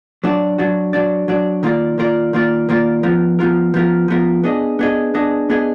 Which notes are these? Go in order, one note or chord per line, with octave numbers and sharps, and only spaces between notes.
F#3 D4 F#4 D5
F#3 D4 F#4 D5
F#3 D4 F#4 D5
F#3 D4 F#4 D5
D#3 A#3 F4 A#4 D5
D#3 A#3 F4 A#4 D5
D#3 A#3 F4 A#4 D5
D#3 A#3 F4 A#4 D5
F3 B3 F4 A#4
F3 B3 F4 A#4
F3 B3 F4 A#4
F3 B3 F4 A#4
B3 D4 G#4 D#5
B3 D4 G#4 D#5
B3 D4 G#4 D#5
B3 D4 G#4 D#5